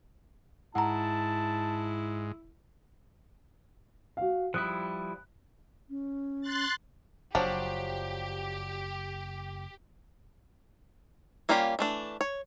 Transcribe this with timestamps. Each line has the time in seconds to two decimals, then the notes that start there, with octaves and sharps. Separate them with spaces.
0.75 G#2 E4 F#5 A5 A#5
4.17 F#4 F5
4.54 F3 G3 E4 D#6 F#6
5.90 C#4
6.41 C6 F#6 A6
7.35 F#1 F3 F#3 D4 G4
11.49 G3 A#3 C#4 F4 G4
11.79 E3 A3 D4
12.21 C#5